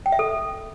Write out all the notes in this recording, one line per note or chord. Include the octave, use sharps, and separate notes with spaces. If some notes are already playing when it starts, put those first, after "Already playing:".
G5
E5
A4